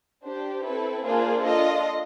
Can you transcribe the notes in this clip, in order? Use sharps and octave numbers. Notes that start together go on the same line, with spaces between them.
D4 G4 C5
C4 E4 A4 B4
A#3 D4 F4 G#4 C5
D4 F4 A4 D#5